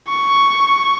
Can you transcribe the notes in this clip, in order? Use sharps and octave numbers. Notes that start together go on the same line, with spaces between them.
C#6